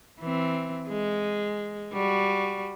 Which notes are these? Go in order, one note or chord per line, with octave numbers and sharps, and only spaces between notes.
E3 C4
G#3
G3 F#4